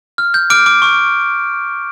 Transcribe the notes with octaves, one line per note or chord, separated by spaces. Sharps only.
F6
G6
D6 F6 D7
D6 D7
C#6